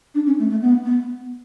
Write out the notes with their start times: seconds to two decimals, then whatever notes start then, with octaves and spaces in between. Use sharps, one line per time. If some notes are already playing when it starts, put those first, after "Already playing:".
0.14 D4
0.26 C#4
0.39 A3
0.50 A3
0.62 B3
0.85 B3